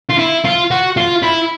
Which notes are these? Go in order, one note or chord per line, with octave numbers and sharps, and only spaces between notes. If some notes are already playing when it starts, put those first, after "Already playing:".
F4
E4
F4
F#4
F4
E4